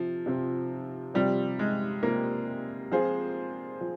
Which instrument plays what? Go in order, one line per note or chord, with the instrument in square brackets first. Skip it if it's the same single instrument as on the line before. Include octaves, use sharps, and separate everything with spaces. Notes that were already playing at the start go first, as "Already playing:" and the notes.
Already playing: [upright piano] C3 C4 [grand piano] F3
[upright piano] C3 F3 C4
[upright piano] C3 F3 C4 [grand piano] G3
[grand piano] G#3
[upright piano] C3 F3 C4 [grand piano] A#3
[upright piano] F3 C4 F4 G#4 C5
F3